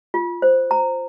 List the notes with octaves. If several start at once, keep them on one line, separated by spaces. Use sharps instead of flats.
F4
C5
A#5